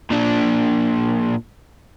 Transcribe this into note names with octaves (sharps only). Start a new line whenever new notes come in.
A#2 D4